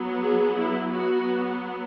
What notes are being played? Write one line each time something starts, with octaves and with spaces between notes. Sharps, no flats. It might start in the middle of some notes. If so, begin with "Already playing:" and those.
Already playing: F#3 B3
G#4
E4
F#3 B3 F#4